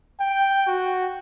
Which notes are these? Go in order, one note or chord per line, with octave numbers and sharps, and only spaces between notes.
G5
F#4